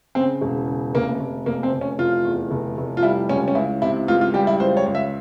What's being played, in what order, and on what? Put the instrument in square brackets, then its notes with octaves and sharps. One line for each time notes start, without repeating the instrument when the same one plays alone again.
[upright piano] C#3 C4
E1
C#3
F1 A#3
F1
F1 A#3
C4
F1
C#4
F1 F4
E2
F1
F1
F4
G3 E4
C#2 C#4
C#4
C#2 E4
C3 E4
C#2 F4
F4
G3 G4
E4
C#2 C5
C#5
C#2
E5